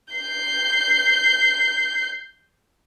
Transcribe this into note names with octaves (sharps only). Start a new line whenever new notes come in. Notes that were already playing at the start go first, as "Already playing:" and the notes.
G6 C7